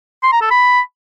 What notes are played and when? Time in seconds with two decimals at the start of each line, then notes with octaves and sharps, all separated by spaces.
0.23 C6
0.32 A#5
0.41 A4
0.51 B5